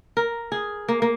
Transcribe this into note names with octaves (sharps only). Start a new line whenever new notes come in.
A#4
G#4
A#3
A#3